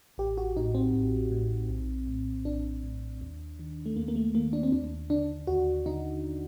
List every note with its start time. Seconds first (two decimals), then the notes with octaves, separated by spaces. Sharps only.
0.18 A1 G4
0.38 F#4
0.57 A2 D#4
0.75 C4
0.94 A1
1.32 A2
1.69 A#1
2.07 A2
2.45 A#1 D4
2.84 A2
3.21 D#2
3.59 D#3
3.86 A3
3.96 D#2 A#3
4.08 A#3
4.16 A3
4.35 D#3 A#3
4.53 D4
4.63 C4
4.72 D#2 D4
5.10 D3 D4
5.47 D#2 F#4
5.86 D3 D#4